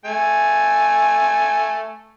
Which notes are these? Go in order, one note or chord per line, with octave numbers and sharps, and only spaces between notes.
A3 G#5